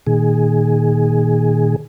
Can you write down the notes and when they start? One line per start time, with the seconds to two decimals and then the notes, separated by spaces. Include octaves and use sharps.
0.07 A#2 D#3 G#4